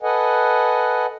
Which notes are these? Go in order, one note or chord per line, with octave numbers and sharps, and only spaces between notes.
A4 B4 D#5 F#5 G#5